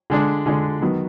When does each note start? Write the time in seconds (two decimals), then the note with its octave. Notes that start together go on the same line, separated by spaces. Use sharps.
0.10 D3 G#3 D4
0.46 D3 G#3 D4
0.81 D#3 F#3 B3